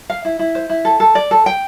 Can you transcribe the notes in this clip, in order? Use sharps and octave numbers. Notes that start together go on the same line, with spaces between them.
F5
E4
E4
C5
E4
A4
A4
D5
A4
G5